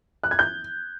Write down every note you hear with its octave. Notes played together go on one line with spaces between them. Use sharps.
F#6
G#6
G6